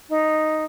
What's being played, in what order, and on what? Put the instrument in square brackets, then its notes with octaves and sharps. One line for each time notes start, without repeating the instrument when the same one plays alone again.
[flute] D#4